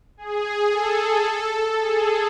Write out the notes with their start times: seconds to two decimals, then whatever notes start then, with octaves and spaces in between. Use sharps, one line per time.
0.17 G#4
0.71 A4
1.80 G#4